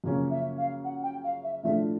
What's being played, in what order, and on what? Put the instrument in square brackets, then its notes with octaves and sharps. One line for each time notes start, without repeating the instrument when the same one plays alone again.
[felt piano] F#2 C#3 F3 A#3 C#4
[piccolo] E5
F5
F#5
G5
F5
E5
[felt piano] A2 F3 A3 D4 F4 [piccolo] E5